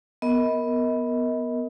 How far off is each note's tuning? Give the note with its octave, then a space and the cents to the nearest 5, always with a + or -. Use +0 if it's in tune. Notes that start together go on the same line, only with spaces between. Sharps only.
B3 +0 A#4 +0 D#5 +35